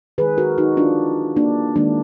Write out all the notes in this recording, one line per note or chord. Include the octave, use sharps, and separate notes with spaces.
D#3 G#3 G#4 B4
F#4 A#4
D#4 F#4
D4 F4
A#3 D4
D#3 G#3 A#3 D4